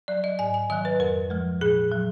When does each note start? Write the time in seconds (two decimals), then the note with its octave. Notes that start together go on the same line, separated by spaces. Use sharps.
0.08 F#3 D5
0.24 D#5
0.39 G#2 G#5
0.54 G#5
0.70 D#3 D#5
0.73 F#3
0.85 B4
1.00 F2 A#4
1.30 F3 G#3
1.61 A#2 G#4
1.92 F#3